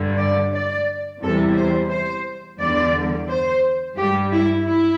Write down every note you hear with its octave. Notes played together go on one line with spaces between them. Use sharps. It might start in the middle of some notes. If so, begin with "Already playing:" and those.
Already playing: G2 D3 G3
D5
D5
E2 C3 E3 G3 A4
C5
C5
E2 D3 G3 D5
C5
G2 G3 G4
E4
E4